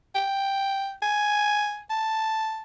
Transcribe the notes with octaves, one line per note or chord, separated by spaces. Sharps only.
G5
G#5
A5